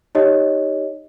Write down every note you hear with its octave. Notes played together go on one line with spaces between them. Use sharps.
D#4 G4 C#5 D#5